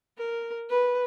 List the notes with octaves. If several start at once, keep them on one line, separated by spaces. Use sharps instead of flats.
A#4
B4